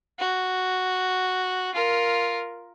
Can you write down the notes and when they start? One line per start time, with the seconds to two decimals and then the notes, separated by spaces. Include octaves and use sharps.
0.19 F#4
1.75 F4 A#4